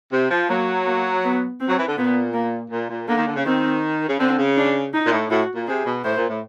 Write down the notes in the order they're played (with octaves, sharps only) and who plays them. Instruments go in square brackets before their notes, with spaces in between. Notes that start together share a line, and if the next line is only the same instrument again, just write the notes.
[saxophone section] C3
F3
[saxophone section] F#3 [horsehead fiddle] A#3
[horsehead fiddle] A#3
B3
C4
[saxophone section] F#3
E3
D3
[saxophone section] A#2 [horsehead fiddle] B3
[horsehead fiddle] A#3
[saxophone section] A#2
A#2
[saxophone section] D3 [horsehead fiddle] A#3
[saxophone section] D#3
D3
C#3
[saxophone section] D#3 [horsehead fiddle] C4
[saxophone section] C#3
[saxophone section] D3 [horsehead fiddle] C4
[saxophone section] C#3
[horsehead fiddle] D4
D#4
[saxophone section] A#2
A2
[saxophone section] A2 [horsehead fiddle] F#4
[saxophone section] A#2
[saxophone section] C3 [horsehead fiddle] G#4
[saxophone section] B2
[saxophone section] A2 [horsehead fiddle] C5
[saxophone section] A#2
A2